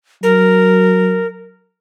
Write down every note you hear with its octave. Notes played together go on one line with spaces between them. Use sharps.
F#3 A#4